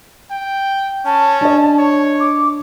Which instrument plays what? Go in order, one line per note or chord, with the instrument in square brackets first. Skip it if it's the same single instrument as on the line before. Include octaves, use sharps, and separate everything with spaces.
[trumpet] G5
[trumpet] C#4 [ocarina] A5
[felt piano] D4 D#5
[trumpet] C#5
[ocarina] D6